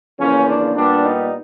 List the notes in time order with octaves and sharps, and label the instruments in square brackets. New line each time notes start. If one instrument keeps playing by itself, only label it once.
[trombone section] E2 C#3 F3 A#3 C#4
D4
A#2 G3 B3 D4
D#4